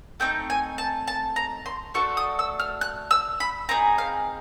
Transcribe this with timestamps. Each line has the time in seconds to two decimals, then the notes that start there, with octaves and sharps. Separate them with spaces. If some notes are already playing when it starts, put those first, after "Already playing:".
0.20 A3 C4 D#4 G5
0.50 G#5
0.78 A5
1.07 A5
1.36 A#5
1.66 C6
1.94 A3 D4 F#4 A4 C#6
2.17 D#6
2.39 E6
2.59 F6
2.81 F#6
3.11 E6
3.40 B5
3.69 C4 D#4 G#4 A#5
3.98 F5